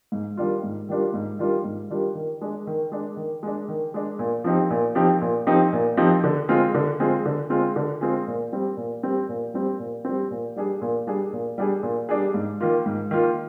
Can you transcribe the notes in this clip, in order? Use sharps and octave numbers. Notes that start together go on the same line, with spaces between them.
G#2
D#3 G3 D4 F4
G#2
D#3 G3 D4 F4
G#2
D#3 G3 D4 F4
G#2
D#3 G3 D4 F4
D#3
G#3 D4
D#3
G#3 D4
D#3
G#3 D4
D#3
G#3 D4
A#2
F3 C4 D#4 G4
A#2
F3 C4 D#4 G4
A#2
F3 C4 D#4 G4
A#2
F3 C4 D#4 G4
D3
G#3 C4 F4 G#4
D3
G#3 C4 F4 G#4
D3
G#3 C4 F4 G#4
D3
G#3 C4 F4 G#4
A#2
G3 C4
A#2
G3 C4
A#2
G3 C4
A#2
G3 C4
A#2
G3 D4 G#4
A#2
G3 D4 G#4
A#2
G3 D4 G#4
A#2
G3 D4 G#4
G#2
D#3 A#3 F4
G#2
D#3 A#3 F4